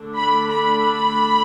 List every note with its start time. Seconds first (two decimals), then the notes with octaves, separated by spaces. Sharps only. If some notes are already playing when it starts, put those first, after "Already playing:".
Already playing: D3 A3 D4
0.18 B5
0.49 B5